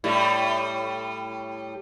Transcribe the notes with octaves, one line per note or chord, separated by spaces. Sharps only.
A2 G3